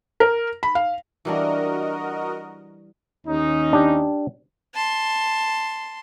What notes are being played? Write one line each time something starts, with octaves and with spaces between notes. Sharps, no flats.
A#4
B5
F5
E3 G3 D4 F#4 A#4 D#5
D#2 C#4 D#4
D4 G4
A5 C6